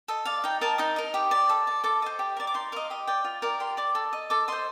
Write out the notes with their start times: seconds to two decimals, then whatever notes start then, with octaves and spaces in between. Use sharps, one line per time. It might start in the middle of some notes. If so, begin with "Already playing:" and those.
0.08 A4 D#5
0.25 D5 F5
0.44 D#4 G5
0.61 A#4 D#5 A5
0.78 D#4 D#6
0.96 A#4 D#5
1.14 G4
1.31 D5
1.49 A4
1.67 D5
1.84 A4 D6
2.02 C5 D#5
2.19 G4
2.37 A#4 D5
2.47 D6
2.54 D#4 C6
2.72 A#4 D#5 F5
2.90 G4 D#5
3.07 D5 G5
3.24 F4
3.42 A#4 D5
3.60 G4 C6
3.77 D5 D6
3.95 A4
4.13 D#5
4.30 A4 D6
4.48 C5 D#5 C6